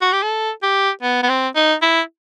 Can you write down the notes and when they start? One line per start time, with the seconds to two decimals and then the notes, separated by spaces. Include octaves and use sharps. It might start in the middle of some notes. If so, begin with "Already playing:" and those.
0.02 F#4
0.13 G4
0.23 A4
0.63 G4
1.03 B3
1.23 B3
1.29 C4
1.56 D#4
1.82 E4